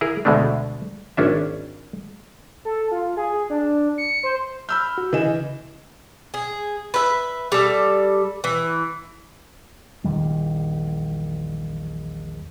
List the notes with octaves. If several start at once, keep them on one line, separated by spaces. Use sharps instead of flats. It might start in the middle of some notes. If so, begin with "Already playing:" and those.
E4 G#4 A#4
D2 B2 G#3 A3 D4
G#1 C#4 D4 E5
A4
F4
G#4
D4
C#7
C5
B5 E6 F6 G6
F#4
C#3 E3 D#5 G#5 E7
G#4
B4 E5
G3 A4
E3
A#1 E2 D#3 G3